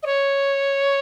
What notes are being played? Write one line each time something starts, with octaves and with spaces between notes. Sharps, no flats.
D#5
C#5